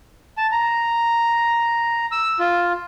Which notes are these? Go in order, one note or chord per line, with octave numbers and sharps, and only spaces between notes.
A5
A#5
E6
F4